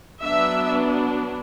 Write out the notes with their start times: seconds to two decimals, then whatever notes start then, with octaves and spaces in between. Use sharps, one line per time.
0.22 F#3 B3 D4 E5